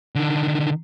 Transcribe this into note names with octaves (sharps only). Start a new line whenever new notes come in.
D3 D#3